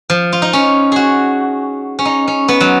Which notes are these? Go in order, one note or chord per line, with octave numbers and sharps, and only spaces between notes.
F3
F4
D#4
C#4
F#4 G#4
C#4
D#4
C#4
B3
F#3